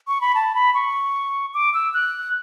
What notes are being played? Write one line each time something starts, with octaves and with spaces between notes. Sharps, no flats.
C#6
B5
A5
B5
C#6
D6
E6
F#6